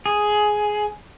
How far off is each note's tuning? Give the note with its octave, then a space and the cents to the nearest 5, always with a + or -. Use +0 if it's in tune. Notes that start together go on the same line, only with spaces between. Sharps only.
G#4 +10